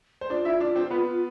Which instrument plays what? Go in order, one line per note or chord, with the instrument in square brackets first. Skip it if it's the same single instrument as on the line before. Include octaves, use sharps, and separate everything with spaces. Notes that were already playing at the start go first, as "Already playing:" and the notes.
[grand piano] C5
[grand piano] D4 D5 [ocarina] F4
[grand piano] E4 E5
D4 D5
C4 C5
B3 B4